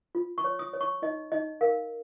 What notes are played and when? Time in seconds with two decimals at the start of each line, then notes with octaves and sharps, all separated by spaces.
0.15 F4
0.38 C#6
0.44 C#5
0.59 D#6
0.73 C#5
0.81 C#6
1.02 D#4 D#5
1.32 D#4 D#5
1.61 A#4 F5